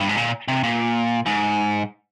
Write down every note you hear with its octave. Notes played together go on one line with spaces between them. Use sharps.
G2
G#2
A#2
C3
A#2
G#2